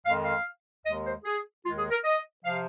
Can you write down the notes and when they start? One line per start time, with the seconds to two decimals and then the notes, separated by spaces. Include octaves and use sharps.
0.05 F2 D#3 G#3 F5
0.25 F5
0.85 D#2 D#3 G#3 D#5
1.05 C5
1.24 G#4
1.64 D#2 D#3 G#3 F4
1.78 G#4
1.91 A#4
2.04 D#5
2.43 C3 F3 F5